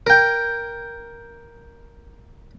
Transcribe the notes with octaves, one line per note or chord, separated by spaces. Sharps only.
A#4 G5